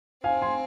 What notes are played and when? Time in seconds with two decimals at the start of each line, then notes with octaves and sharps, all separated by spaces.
0.24 C4 F5 G#5
0.42 G#5 C6